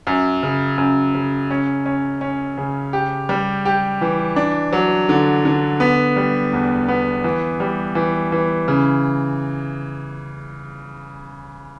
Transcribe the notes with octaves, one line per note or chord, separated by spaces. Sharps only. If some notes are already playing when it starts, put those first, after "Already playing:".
F#2
C#3
F#2
C#3
C#4
C#4
C#4
C#3
G4
G3
G4
E3
D4
F#3
D3
D3
B3
G3
E2
B3
E3
G3
E3
E3
C#3